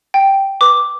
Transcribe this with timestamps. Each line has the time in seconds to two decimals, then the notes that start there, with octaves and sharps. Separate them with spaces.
0.14 G5
0.61 B4 D6